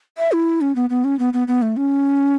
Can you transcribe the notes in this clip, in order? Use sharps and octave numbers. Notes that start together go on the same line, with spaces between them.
E5
E4
C#4
B3
B3
C#4
B3
B3
B3
A3
C#4